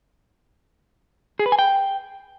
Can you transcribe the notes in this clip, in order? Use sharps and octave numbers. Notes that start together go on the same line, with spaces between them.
G#4
B4
G#5
G5